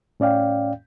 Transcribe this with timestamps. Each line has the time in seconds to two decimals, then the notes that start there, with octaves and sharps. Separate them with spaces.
0.20 A2 C#4 D5 F5 G5